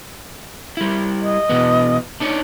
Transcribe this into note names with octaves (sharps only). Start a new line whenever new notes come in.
G3 E4
D#5
B2 E3 B3
D4 D#4 C#5